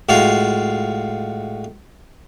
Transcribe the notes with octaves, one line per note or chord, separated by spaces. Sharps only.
A2 G#3 F4 F#4 F5